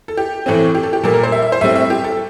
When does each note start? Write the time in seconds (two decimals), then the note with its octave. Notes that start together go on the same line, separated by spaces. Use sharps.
0.08 A4
0.17 G4
0.46 A2 E3 A3 C4
0.75 G4
0.83 A4
0.93 G4
1.03 A#2 G3 A#3 A4
1.14 A#4
1.23 C5
1.32 E5
1.42 E5
1.52 C5
1.61 A2 G3 C4 E5
1.75 E5
1.90 G4
2.04 A4